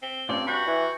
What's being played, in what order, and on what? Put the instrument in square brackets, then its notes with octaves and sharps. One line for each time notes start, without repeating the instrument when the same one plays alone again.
[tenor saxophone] C4
[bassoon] G2 [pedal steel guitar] C4 C#4 F4 [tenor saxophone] D5
[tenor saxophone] F#4 [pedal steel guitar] G5 B5
[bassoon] E3